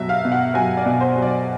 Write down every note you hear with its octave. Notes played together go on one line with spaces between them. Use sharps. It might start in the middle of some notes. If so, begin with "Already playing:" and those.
Already playing: B2 F#3 E5
F5
B2
F#5
F#3 G#5
D5
B2
C5
F#3
D5